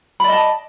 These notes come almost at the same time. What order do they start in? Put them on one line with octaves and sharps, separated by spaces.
B5 D5 D#5 A5